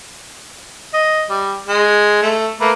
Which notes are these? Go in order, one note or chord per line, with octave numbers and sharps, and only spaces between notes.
D#5
G3
G#3
A3
A3 A#3 B4